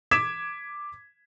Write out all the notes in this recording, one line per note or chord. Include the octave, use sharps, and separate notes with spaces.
D6 G#6 B6 E7